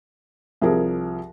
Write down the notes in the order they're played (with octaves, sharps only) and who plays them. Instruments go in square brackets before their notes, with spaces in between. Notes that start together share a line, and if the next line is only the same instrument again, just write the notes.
[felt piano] C2 F3 G#4 A#4